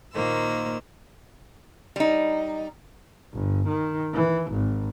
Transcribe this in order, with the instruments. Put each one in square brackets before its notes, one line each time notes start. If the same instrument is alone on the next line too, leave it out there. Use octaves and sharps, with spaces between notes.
[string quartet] A#2 D#3 A#3 C5 E6
[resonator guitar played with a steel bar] G3 D#4
[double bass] G1
D#3
E3
G#1